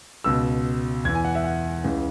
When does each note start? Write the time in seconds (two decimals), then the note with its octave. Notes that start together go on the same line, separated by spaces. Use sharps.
0.24 C#2 B2 E6
1.05 E2 G#6
1.09 E3
1.15 G#5
1.24 F#5
1.35 E5
1.44 F#5
1.84 C#2 C#3 E3